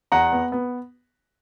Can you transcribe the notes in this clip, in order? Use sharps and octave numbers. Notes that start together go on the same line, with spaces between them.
E2 F#5 A#5
B3
B3